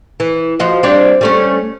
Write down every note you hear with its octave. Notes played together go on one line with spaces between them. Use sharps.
E3
F3 F#4 D#5
G3 C4 D4
G3 A3 C#4